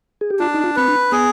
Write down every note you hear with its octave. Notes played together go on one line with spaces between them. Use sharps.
G#4
G4
D4 F4
D#4
F4
C4 B4
D4
B3 G#4